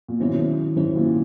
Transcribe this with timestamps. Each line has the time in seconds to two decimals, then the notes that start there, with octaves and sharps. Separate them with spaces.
0.08 A#2
0.20 G#2 B2 D#3 F#3 C#4 E4
0.76 G#2 D#3 F#3 C#4 E4
0.96 A#2